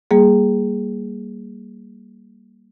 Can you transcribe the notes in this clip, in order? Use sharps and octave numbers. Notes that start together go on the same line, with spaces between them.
G3 A#3 G#4